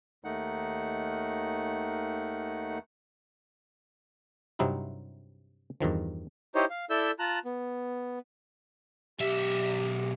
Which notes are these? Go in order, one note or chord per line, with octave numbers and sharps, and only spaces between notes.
D#2 D#3 A3 D#4 F#5
G2 C3 F#3 C4 D#4 E4
E2 G2 D#3 F3
D#4 E4 G4 C5 C#5 D#5
F5
E4 A4 D5 E5 E6 G6
F4 A5 A#5 F#6
B3
B1 G4 E5